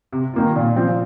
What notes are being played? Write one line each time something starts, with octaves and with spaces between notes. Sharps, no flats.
C3
D#3 A#3 F4
A#2
F3 C4 F4